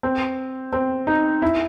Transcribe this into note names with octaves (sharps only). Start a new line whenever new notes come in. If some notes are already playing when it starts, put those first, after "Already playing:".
C4
C4
D#4
E4